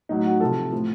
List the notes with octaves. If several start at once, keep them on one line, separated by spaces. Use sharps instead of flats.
A2 F#3 D#4
F#4
C3 F3 A4
A2 F3